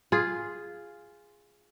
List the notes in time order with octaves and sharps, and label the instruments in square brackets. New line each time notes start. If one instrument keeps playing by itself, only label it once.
[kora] F4 G#4